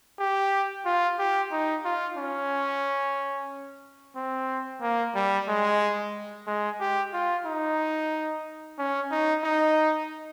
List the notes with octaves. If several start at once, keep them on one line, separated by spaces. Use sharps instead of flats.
G4
F4
G4
D#4
F4
C#4
C4
A#3
G3
G#3
G#3
G4
F4
D#4
C#4
D#4
D#4